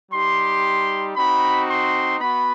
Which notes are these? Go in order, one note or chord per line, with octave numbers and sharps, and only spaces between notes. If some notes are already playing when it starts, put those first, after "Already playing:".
G3 D#4 G4 C6
C4 D#4 F#4 B5
C6
B3 F#4 B5